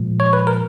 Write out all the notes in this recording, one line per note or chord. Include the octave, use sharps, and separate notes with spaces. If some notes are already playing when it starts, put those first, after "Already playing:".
Already playing: A#2 F3 G#3
C#5
B4
A#4